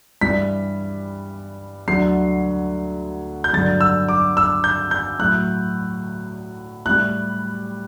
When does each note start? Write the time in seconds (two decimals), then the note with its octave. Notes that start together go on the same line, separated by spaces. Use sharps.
0.21 G2 E3 G3 B6
1.88 D2 D3 F#3 C7
3.44 G6
3.53 G2 D3 F#3 A6
3.81 E6
4.09 D6
4.37 E6
4.64 G6
4.91 G6
5.19 A2 F#3 F#6
6.86 A2 G3 F#6